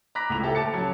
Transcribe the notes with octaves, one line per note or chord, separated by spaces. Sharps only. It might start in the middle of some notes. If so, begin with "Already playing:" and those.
A#5 B5 D6 F#6 A#6 B6
C#2 A2 F7
G4 A4 E5
A5 D6 A6 C#7
F#3 C#4